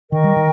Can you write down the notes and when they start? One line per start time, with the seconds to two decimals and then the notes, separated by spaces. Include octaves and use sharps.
0.12 D#3 A#4 D#5 G5 C#6
0.24 G3
0.36 D#3